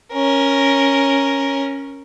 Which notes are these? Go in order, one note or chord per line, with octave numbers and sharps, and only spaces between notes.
C#4 A#4